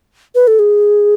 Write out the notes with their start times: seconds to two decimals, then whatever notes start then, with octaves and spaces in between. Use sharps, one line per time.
0.35 B4
0.47 A4
0.59 G#4